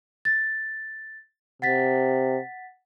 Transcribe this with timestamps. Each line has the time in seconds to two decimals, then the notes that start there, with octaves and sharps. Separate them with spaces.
0.25 A6
1.62 C3 F#5 A6 B6